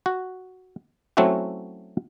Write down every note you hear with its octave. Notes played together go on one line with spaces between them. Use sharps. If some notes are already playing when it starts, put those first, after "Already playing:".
F#4
F#3 A3 C4 C#4 E4 F#4